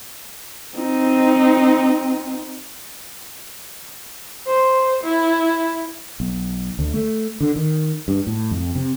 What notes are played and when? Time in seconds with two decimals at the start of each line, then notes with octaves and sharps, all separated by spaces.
0.76 C4 D#4
4.47 C5
5.04 E4
6.20 B1
6.79 D2
6.94 A3
7.41 D3
7.56 D#3
8.08 G2
8.27 A2
8.51 F2
8.75 C3